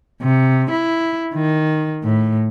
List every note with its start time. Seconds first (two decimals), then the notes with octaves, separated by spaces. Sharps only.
0.22 C3
0.71 E4
1.34 D#3
2.04 A2